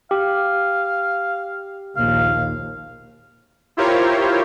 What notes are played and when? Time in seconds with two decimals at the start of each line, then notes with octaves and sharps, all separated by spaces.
0.11 G4 F5
1.97 A#1 D#2 F5
3.77 E4 F4 G4 A#4 C5 C#5